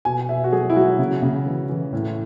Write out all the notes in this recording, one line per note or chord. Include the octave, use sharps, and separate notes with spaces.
B2 G#5
B2 E5
F#4
F#3 G#4
E4
F#3 F#4
C#3
C#3
E3
E3
A2